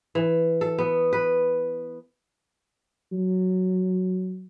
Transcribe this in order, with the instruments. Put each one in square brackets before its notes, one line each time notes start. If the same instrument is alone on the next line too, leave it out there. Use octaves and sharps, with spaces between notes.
[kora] E3
A4
B3
B4
[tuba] F#3